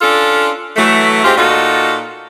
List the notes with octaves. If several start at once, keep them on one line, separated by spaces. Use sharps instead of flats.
C#4 D4 F4 A4
E3 F#3 A3
G#3 C4 F4 G4
A#2 D#4 F4 F#4 A4